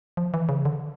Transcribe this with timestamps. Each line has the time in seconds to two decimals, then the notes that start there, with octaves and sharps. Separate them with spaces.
0.17 F3
0.34 E3
0.49 C#3
0.65 D3